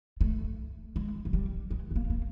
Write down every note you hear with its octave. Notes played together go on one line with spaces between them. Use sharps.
A3
G#3
F#3
G3
G#3
B3
A#3
A#3